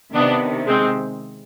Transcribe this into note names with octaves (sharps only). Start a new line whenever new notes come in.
C3 D#3 B3 D4
G#3 C4